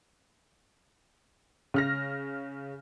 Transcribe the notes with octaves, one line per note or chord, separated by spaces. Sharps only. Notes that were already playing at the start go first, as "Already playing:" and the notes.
C#3 F6 A#6